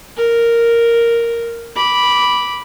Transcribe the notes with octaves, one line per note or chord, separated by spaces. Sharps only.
A#4
B5 D6